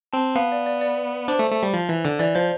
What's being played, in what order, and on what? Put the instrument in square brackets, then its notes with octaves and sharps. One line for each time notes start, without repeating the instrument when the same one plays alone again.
[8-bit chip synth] C4 [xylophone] A5
[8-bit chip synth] B3 [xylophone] F5
[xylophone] D5
D5
D5
[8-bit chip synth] D4 [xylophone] C5
[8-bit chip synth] A3
A3
G3
F3
E3
D3
[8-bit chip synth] E3 [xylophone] D5
[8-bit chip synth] F3 [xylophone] C5